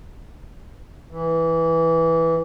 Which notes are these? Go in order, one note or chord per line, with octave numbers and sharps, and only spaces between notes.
E3